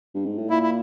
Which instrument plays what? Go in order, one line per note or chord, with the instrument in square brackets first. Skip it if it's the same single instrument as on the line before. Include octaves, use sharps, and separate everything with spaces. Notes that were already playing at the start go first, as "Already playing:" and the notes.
[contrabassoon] G2
G#2
A2
[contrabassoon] A#2 [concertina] E4
[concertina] E4